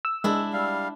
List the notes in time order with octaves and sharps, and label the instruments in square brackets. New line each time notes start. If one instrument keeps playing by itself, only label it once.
[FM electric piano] E6
[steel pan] G#3 [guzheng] D4 E4
[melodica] G3 F5